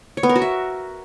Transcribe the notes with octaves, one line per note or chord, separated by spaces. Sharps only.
C#5
B3
A#4
F#4
E5